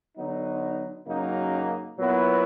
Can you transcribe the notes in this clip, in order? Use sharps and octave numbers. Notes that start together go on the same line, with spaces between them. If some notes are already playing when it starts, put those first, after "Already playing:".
D3 F#3 B3 D#4
F#2 C#3 F#3 A#3 D#4
A#2 F#3 B3 E4